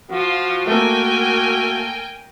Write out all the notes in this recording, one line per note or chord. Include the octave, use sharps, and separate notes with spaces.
F3 F4 F#4
A3 A#3 A#4 G5 G#5